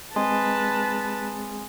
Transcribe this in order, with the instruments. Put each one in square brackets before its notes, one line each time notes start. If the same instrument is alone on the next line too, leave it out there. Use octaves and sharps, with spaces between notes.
[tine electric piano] G#3 C4 G#4 [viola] B4 A5 [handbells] G#5 C6 D#6